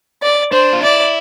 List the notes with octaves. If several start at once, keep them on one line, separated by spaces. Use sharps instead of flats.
D5
D4 C5
F4
E4 D5